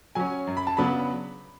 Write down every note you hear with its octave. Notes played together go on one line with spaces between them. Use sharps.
F#3 C#4 G#5
F#2
B5
A5
C#3 F#3 B3 D4 B5